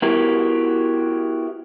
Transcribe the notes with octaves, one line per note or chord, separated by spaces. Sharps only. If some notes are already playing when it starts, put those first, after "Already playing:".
B3 E4 F#4 G4 A#4